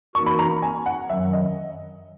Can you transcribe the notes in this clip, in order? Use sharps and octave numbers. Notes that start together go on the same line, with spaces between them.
E3 A#3 D#4 F#4 A#4 C#6
B5
A#5
G#5
F#5
F#2 D#3 F#3 E5
D#5